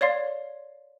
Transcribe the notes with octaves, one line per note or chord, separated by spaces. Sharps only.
C#5 D5 F5 C6